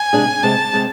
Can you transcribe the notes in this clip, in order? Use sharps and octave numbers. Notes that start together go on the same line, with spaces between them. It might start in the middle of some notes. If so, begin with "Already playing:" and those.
Already playing: G#5
C3 G#3 D4 G#4
C3 G#3 C4 A5
C3 G#3 C4